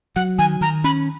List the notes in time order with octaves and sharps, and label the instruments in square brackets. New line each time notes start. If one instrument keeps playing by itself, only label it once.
[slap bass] F#3 [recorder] F#5
[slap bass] D#3 [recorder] G#5
[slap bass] D#3 [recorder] A#5
[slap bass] C#4 [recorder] B5